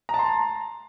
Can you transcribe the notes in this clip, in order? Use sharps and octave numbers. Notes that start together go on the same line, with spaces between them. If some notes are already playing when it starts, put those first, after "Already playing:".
A5 A#5 C6